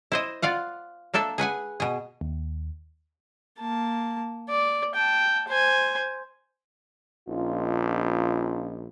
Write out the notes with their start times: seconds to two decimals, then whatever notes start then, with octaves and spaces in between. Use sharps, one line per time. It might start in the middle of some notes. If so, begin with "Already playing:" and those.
0.12 E4 C5 D#5
0.42 F4 D5 F5 F#5
1.14 A#3 D4 A4 E5 A5
1.38 G#4 B4 F#5 G#5
1.80 B2 G#4
2.21 D#2
3.60 A#3 A5
4.49 D5
4.95 G5 A5
5.48 C5 G#5
7.28 A#1 C#4 D#4 F4